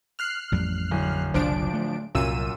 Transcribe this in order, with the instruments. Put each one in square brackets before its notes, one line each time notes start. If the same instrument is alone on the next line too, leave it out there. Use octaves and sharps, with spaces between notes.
[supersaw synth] F6 F#6 C7
[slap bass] A1 F2 G3
[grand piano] D1
[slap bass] F#1 C2 F#3 [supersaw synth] F3 D4 D7
[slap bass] A3
[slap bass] C2 [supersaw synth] F#2 E6 D#7 [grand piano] A#2